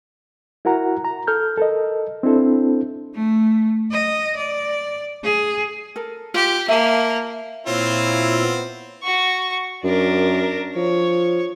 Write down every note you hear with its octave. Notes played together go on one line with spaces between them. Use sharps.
E4 F#4 A#4 F#5 A#5
A#5
A4 F6 G6
A4 A#4 D#5
C4 D4 E4 A4 C5
A3
D#5
D5
G#4
A4 A#4
F4 G4
A#3 E5 A5
A#2 C4 E4 F4 C#5
B3
F#4 C#6
F#2 D4 A#4
F3 C#5